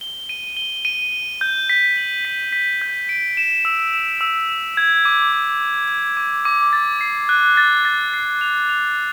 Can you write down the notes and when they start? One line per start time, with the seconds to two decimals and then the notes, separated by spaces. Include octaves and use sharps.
0.01 G7
0.29 D#7
0.57 G7
0.85 D#7
1.12 G7
1.41 G6
1.70 B6
1.97 F#7
2.25 B6
2.53 B6
2.82 G6
3.09 D7
3.37 E7
3.65 E6
3.94 E7
4.21 E6
4.49 E7
4.77 G#6
5.05 D6
5.32 D6
5.61 D6
5.88 D6
6.17 D6
6.45 D6
6.73 A6
7.01 C7
7.29 F#6
7.57 A6
7.85 A6
8.14 C7
8.41 F7
8.69 F7